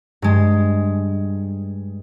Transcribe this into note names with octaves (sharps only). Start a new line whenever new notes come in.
G2 G#3